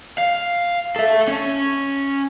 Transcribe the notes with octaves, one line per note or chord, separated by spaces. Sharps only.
F5
A4 E5
C#4